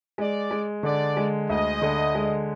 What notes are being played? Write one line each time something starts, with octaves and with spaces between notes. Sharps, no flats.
G#3 D5
G#3
D3 D5
G#3
D2 D#5
D3
G#3